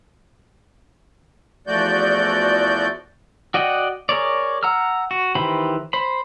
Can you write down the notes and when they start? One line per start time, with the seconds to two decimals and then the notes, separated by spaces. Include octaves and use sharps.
1.67 E2 F3 A3 F#4 D5 G6
3.54 F#4 D5 D#5 F#5 G5
4.09 G#4 A#4 C#5 D5
4.63 F#5 A#5 E6 F6
5.11 F#4
5.35 D#3 E3 G4 C5 B5
5.93 C5 B5